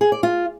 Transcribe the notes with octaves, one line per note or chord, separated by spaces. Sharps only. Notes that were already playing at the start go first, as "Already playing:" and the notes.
G#4
D5
F4